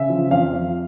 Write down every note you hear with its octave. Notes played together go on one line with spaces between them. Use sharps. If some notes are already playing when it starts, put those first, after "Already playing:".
Already playing: C#3 E5
F3
F2 F5
F2